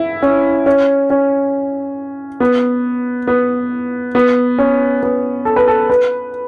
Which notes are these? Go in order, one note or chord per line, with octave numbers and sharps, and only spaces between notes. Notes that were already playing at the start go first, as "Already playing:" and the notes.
Already playing: E4
C#4
C#4
C#4
B3
B3
B3
C#4
B3
A4
B4
A4
B4